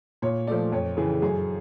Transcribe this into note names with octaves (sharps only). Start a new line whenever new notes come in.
A#2 C#5
F3 A3 D5
F2 C#5
C#3 E3 G#4
F#2 G#4